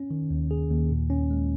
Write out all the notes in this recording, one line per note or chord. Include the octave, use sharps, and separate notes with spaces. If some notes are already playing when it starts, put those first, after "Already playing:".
Already playing: C#4
D#3
D#2
G#4
D#2
A#2
C#4
G#3